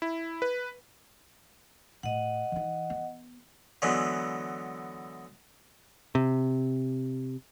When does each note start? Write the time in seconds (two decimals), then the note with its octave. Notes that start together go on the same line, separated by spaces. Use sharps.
0.02 E4
0.42 B4
2.03 A2 D#5 F#5
2.52 E3 D#4
2.90 B3
3.82 D3 E3 F#3 G#3 B3
6.15 C3